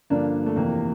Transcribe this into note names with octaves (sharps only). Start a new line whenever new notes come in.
G2 D3 F3 A#3 D4
A3
F2 C3 E3 A#3